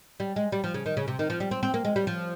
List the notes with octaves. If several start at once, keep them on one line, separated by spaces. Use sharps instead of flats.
G3
G#3
G3
F3
C#3
D#3
C#3
C3
D#3
F3
G3
C4
C4
A#3
G#3
G3
F3